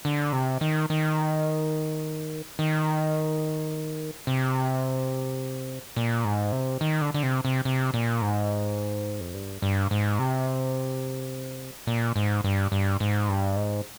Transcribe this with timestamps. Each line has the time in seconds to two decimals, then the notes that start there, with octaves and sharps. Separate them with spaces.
0.05 D3
0.32 C3
0.61 D#3
0.90 D#3
2.59 D#3
4.27 C3
5.96 A#2
6.25 G#2
6.52 C3
6.81 D#3
7.01 D3
7.14 D3
7.23 C3
7.45 C3
7.65 C3
7.94 A#2
8.21 G#2
9.20 F2
9.34 G2
9.62 G2
9.91 G#2
10.19 C3
11.87 A#2
12.16 G#2
12.44 G2
12.72 G2
13.00 G#2
13.28 G2
13.56 G#2